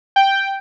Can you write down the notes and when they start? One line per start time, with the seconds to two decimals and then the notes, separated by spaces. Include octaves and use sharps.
0.16 G5